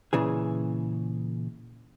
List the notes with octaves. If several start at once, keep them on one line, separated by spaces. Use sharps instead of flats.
A#2 C#3 E3 G#4